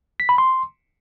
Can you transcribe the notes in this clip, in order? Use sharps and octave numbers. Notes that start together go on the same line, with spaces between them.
B6
B5
C6